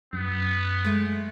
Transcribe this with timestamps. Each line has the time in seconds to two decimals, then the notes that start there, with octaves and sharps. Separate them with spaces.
0.13 F#2 B3
0.85 G#3 A3